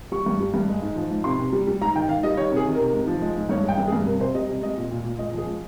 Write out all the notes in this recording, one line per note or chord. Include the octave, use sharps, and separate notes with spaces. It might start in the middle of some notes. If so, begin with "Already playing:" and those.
G3 C#6
G2
G3
G2
G#3
G#2
F3
G#2
C3 C6
C3
G3
G3
G#2 A#5
D#3 G5
D#3 F5
G3 D#5
D#3 C#5
C3
G#4
D#3
C3 A#4
G#2
F3
G#3
G#2
G2 C#5
G#3
G5
G2
G#4
G2
C3 A#4
C3 C5
G3 D#5
C3
G#3 D#5
A#2
A#2
A#2
G#3 D#5
F3 G#4
G#3